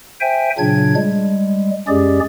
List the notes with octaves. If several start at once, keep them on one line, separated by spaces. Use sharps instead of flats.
C5 E5 G5 G#5
A#2 C#3 F#3 D4 G#6
G3 G#3
F#2 G#3 C#4 G4 G#4 D5